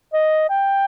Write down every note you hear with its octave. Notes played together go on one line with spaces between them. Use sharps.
D#5
G5